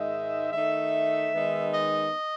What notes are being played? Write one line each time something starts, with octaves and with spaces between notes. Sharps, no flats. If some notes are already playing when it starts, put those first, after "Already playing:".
Already playing: G#2 D#3 G#3 D#4 E5
D#3 A3 D#4 E5
D#3 G#3 B3 D#4
D#5